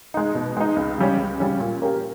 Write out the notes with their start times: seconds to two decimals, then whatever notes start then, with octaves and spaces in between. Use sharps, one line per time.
0.14 G#3 D#4
0.35 B2
0.57 G#3 D#4
0.76 C#2
0.98 C#3 G3 C#4
1.18 C#2
1.40 C#3 G3 C#4
1.60 A#2
1.82 A#3 C#4 G4